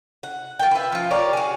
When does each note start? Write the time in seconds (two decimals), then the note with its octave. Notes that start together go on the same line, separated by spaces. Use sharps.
0.23 F#5
0.59 F4 A#4 G5
0.71 B4 E5
0.92 F3 F4
1.10 G4 A#4 C#5 D5
1.33 F#4 G#4